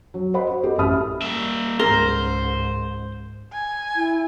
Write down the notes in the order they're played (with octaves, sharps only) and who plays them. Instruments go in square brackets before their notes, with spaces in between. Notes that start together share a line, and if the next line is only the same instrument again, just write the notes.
[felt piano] F#3
C5 D#5 F#5 B5
F#4
G4 A4 A#4 D#5
A1 E5 A5 B5 D#6 F6
[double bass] G3 [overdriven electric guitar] A#3 E5
[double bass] C#2 G#2 [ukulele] A#4 [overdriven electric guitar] C5
[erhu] G#5
[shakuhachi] E4